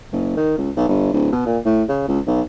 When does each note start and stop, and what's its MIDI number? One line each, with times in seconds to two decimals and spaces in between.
0.13 0.34 30
0.37 0.54 51
0.58 0.71 37
0.76 0.86 35
0.89 1.11 31
1.13 1.31 26
1.32 1.44 47
1.46 1.58 46
1.65 1.83 45
1.89 2.04 49
2.08 2.20 37
2.27 2.41 35